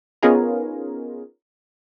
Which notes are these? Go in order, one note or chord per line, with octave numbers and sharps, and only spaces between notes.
B3 C#4 D#4 F4 G#4 A#4